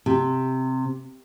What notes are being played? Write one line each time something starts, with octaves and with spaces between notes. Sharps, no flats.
C3